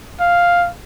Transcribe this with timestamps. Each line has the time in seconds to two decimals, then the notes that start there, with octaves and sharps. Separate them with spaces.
0.20 F5